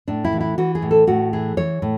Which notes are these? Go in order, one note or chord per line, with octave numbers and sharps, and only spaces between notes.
A2 D4
E4
E3
E4
E3 F#4
G#4
A2
A4
A2 F#4
E3 G#4
E3 C#5
A2